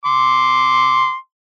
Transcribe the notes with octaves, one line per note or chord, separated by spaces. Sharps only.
C6 D6